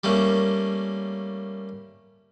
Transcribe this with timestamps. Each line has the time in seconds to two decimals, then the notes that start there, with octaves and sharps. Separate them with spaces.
0.04 G3 A3 A#3 C#4